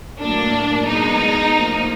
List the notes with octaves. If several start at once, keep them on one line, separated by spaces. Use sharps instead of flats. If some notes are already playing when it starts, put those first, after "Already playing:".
A2 F#3 A#3 D4
B2 G#3 B3 D#4
A2 F3 A#3